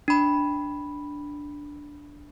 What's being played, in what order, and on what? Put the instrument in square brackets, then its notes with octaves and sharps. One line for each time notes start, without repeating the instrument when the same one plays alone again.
[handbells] D4 B5